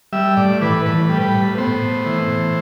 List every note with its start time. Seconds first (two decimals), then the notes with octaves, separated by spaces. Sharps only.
0.13 G3 E5
0.37 A2 D5
0.61 E3 B4
0.86 A2 B4
1.09 G3
1.22 B4
1.34 A2
1.58 B3 C5
1.82 A2
2.06 E3
2.31 A2